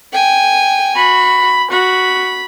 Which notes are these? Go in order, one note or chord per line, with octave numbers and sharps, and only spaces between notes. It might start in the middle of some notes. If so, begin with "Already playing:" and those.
G5 G#5
F#4 B5
F#4 B5